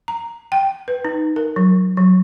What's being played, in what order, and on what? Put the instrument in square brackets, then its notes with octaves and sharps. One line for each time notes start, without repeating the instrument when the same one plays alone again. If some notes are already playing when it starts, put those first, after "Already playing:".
[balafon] A#5
G5
B4
D#4
A#4
F#3
F#3